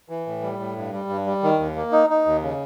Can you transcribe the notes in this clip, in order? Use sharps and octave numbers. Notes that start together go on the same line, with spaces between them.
E3
A2
G3
A2
G2
G3
G2
G3
D#3
D#2
A#3
D#4
D#4
D#2
C#3